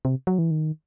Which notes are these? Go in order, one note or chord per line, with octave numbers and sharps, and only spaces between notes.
C3
F#3
E3
D#3